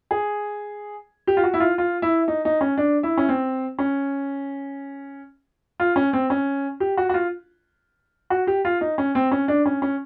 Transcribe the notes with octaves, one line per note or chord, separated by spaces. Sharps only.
G#4
G4
F4
F#4
E4
F4
F4
E4
D#4
D#4
C#4
D4
E4
C#4
C4
C#4
F4
C#4
C4
C#4
G4
F#4
F#4
F4
F#4
G4
F4
D#4
C#4
C4
C#4
D4
C#4
C#4